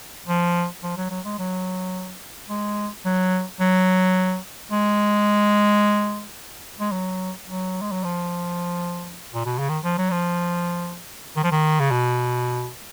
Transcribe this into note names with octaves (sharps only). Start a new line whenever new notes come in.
F3
F3
F#3
F#3
G#3
F#3
G#3
F#3
F#3
G#3
G#3
F#3
F#3
G#3
F#3
F3
A#2
B2
C#3
D#3
F3
F#3
F3
D#3
F3
D#3
C#3
B2